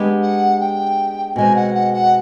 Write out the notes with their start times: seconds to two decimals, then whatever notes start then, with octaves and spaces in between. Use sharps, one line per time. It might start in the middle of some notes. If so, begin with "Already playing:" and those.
Already playing: G#3 B3 D4 G4
0.22 F#5
0.60 G5
1.36 B2 G#3 C4 G#5
1.56 F#5
1.75 F#5
1.94 F#5